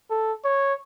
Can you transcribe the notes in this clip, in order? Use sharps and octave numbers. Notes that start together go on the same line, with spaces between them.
A4
C#5